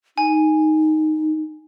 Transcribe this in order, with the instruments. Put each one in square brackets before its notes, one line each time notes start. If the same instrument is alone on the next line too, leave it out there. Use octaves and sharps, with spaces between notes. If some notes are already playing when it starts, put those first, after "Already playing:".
[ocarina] D#4 [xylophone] G#5